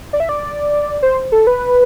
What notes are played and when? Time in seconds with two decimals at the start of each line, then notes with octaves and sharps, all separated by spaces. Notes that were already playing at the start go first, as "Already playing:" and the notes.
0.13 D5
0.20 E5
0.29 D5
1.02 C5
1.32 A4
1.47 B4